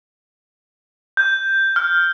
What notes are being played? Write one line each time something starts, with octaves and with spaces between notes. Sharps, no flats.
G6
F6